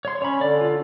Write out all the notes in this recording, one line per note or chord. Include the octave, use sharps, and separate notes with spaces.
C#5 C6
C#4 C#5 B5
D3 D5
F4